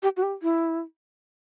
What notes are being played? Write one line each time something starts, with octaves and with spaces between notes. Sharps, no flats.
G4
F#4
G4
E4